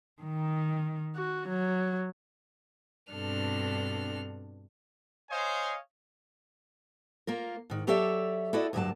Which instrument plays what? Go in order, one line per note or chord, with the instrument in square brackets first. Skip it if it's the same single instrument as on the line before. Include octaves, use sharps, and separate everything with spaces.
[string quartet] D#3
F#4
F#3
G2 B2 C4 D4 A4 F6
[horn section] C5 C#5 D#5 F5 G#5
[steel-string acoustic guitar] A#3 F4 A#4
G#2 D#3
F#3 G4 A4 C#5 D5 E5
E4 F#4 A4 D5 D#5
D2 G2 D3 F#3 A#3 A5